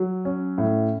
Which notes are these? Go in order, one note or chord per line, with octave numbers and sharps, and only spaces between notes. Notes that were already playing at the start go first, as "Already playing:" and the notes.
Already playing: F#3
C#4
A2